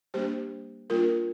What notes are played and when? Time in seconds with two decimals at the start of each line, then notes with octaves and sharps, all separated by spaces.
0.14 G3 A#3 D4 G4 C5
0.90 G3 A#3 D4 F4 A#4